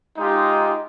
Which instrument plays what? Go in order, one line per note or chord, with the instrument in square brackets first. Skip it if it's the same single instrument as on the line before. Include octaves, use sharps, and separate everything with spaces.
[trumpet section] G#3 D#4 F4 G4